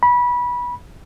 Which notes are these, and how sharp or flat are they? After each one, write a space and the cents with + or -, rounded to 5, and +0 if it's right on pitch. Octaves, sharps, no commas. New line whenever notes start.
B5 -20